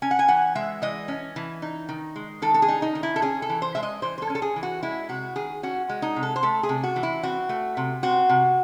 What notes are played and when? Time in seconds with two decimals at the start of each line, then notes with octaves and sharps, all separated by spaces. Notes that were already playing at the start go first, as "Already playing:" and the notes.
0.02 C#4 G#5
0.11 F#5
0.19 G#5
0.28 E3 F#5
0.55 G#3 E5
0.82 E3 D#5
1.08 C#4
1.36 E3
1.62 D#4
1.89 D#3
2.16 G#3
2.42 D#3 A4
2.54 A4
2.62 G#4
2.68 D#4
2.82 D#4
2.95 D#3
3.03 E4
3.16 A4
3.22 C#4 G#4
3.42 A4
3.50 E3
3.62 C5
3.75 G#3 E5
3.83 D#5
4.02 E3 C5
4.18 C5
4.22 A4
4.30 C#4
4.35 A4
4.42 G#4
4.56 E3
4.63 F#4
4.83 G#3 E4
5.09 C3 F#4
5.36 D#3 G#4
5.63 C#4 F#4
5.89 G#3
6.02 D#4
6.16 C3
6.23 A4
6.36 C5
6.43 A3 A4
6.63 G#4
6.69 C3
6.83 F#4
6.96 E3
7.03 E4
7.23 C4 F#4
7.49 A3
7.77 C3
8.03 C4 F#4
8.29 C3